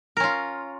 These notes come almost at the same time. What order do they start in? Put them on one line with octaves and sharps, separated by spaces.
A#4 C#4 F4